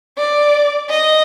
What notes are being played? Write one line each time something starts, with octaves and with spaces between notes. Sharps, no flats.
D5
D#5